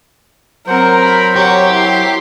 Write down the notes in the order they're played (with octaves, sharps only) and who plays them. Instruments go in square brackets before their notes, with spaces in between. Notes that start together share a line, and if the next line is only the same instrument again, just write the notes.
[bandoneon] F#3 C5 [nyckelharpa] C4 F#5 [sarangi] A#4
[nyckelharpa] B5
[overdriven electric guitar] G4 [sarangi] C#5 [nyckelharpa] F#5 C#6
[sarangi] E4 [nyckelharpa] C6